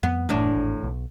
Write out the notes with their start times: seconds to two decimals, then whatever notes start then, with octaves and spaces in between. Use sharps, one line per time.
0.03 F2 B3
0.29 F#1 E2 A2 A3 D4
0.55 G#1
0.83 B1